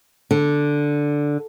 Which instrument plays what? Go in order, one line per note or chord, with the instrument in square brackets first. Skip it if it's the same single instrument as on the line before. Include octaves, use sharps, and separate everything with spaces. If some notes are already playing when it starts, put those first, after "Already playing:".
[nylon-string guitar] D3